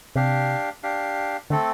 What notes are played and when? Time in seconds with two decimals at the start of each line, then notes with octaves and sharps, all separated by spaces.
0.16 C3 D4 G4 F5
0.83 D4 G4 F5
1.50 D3 A3 C4 A4